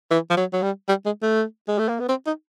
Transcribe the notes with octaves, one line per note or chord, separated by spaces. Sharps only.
E3
F3
F#3
F#3
G3
G3
G#3
A3
G#3
A3
A#3
B3
C4
D#4